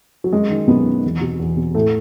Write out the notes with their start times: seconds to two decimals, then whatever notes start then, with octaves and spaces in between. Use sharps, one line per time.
0.24 F#3
0.33 F#2 G#3
0.50 D#3
0.67 F#2 B2 B3
0.86 D#3
1.04 E2
1.21 B2
1.40 E2
1.57 B2
1.74 A2 A3